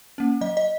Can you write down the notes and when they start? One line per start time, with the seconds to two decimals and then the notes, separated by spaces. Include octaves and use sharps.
0.18 A#3 C#4
0.41 F#3 D#5
0.57 D#5